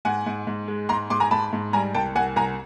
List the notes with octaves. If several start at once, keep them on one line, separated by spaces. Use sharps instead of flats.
G#2 F#5 G#5
G#2
G#2
G#3
G#2 A#5 C6
G#2 C6 D6
G#5 A#5
G#2 A5 B5
G#2
G3 G#5 A#5
C2 G5 A5
C2 F#5 G#5
C2 G#5 A#5